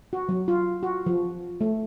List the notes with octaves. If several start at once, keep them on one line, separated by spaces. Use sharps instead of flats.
F#4
F#3
F4
F#4
F3
A3